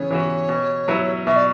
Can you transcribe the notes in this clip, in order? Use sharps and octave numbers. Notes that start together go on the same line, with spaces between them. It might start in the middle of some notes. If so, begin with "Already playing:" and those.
Already playing: C#3 E3 B3 C#5
E3 B3 F#4
B2
F#3 B3 E4
B2 E5
D5